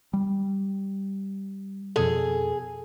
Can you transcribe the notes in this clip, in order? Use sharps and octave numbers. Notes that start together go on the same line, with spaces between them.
G3
F2 B2 G#4 A4